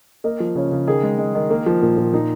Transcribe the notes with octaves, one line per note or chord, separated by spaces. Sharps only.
A#3 D#5
F3
C#3 C#5
C#3
D#3 G#4
G#3
G#3
D#3
A#3
F3
A#2
A#2
A#2 D#4